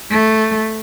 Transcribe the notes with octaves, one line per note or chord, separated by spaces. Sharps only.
A3